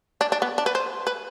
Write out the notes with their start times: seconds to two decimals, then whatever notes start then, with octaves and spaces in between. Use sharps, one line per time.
0.21 D4
0.32 D4
0.42 B3
0.58 D4
0.66 B4
0.75 C5
1.07 B4